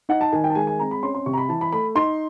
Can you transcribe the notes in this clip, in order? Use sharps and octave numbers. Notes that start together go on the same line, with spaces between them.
D#4 F#5
A5
D#3 G#5
G5
A5
G#3 G#5
G#5
C4 A#5
B5
C#4 C6
C6
C3 C#6
A#5
B5
E3 A5
B5
A3 B5
D#4 C6